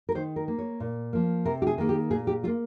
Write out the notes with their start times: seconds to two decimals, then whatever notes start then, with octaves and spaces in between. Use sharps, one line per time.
0.09 A#4
0.15 D#3 C5
0.36 A#4
0.48 A#3
0.59 C#5
0.80 A#2
1.13 F3 A#3
1.45 C3 A#4
1.62 G4
1.67 G#4
1.78 D#3 A#3
1.89 G4
2.10 A#2 G#4
2.27 G4
2.43 G3 F4
2.47 A#3